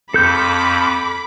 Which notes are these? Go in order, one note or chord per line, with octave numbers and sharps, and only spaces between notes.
F2 A4 B5 D6 G6